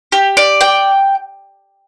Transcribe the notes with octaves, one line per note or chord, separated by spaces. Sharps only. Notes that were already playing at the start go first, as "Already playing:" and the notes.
G4
D5
G5